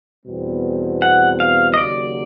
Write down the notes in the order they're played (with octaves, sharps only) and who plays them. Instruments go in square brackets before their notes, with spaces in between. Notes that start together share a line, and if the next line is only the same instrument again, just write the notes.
[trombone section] E2 B2 G3 C4
[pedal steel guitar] F#5
F5
D#5
[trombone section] D#2 C#3 F#3 [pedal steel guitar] D5